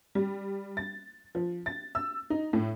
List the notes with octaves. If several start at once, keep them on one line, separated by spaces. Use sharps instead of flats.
G3
A6
F3
A6
E6
D#4
A2